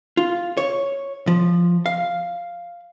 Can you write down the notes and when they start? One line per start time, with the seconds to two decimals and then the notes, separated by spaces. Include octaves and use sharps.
0.17 F4
0.57 C#5
1.27 F3
1.86 F5